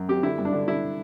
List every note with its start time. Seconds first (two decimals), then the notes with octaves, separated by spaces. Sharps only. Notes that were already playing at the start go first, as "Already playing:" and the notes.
Already playing: F#2
0.09 C4 G4
0.23 D3 E4
0.38 G2
0.45 D4
0.53 D3
0.67 D3 E4